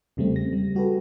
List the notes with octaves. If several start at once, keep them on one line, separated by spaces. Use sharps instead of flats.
E2 C#3 G3 A3 C4
A#6
G3
G3 F#4 G4 A4 B4